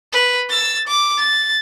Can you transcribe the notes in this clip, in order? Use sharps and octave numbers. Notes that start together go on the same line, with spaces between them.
B4
E6 A6
D6
A6